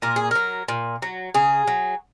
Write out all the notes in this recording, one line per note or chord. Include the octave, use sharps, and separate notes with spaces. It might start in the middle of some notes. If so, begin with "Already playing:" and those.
A#2 A#4
G#4
F#3 A#4
A#2
F#3
C#3 G#4
F#3